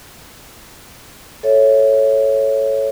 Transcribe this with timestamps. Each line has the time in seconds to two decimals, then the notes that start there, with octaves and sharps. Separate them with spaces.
1.43 A4 C#5 E5